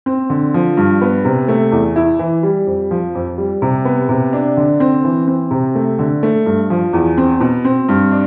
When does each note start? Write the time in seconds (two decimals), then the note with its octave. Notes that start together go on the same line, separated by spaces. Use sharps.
0.06 C4
0.30 D3
0.54 F3
0.77 G2
1.01 B3
1.25 C3
1.48 A3
1.72 E2
1.96 E4
2.19 E3
2.43 G3
2.67 F2
2.91 F3
3.15 F2
3.38 G3
3.62 C3
3.85 B3
4.09 C3
4.33 D4
4.57 D3
4.80 C4
5.04 E3
5.27 C4
5.51 C3
5.75 A3
5.99 D3
6.23 A3
6.46 G2
6.70 F3
6.93 E2
7.17 C4
7.41 B2
7.65 C4
7.89 G2
8.12 D4